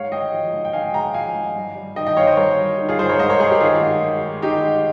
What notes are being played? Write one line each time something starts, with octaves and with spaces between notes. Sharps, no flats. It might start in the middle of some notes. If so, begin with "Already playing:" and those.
Already playing: G#2 C#5 F5
G#3 D#5 G5
F3
G#2
G5
G#2 F5 G#5
G#3 G5 A#5
F3 F5 G#5
G#2
G2
G3
D#3 D#5 G5
D#5 G5
G2 C#5 F5
C5 D#5
G2 A#4 C#5
G3
D#3
F4 G#4
G2 G#4 C5
A#4 C#5
G#2 C5 D#5
A#4 C#5
G#3 G#4 C5
G4 A#4
D#3 F4 G#4
G#2
G#2
G#3
D#3 D#4 G4
G#2